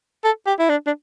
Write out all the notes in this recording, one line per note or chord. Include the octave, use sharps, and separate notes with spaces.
A4
G4
E4
D4
D4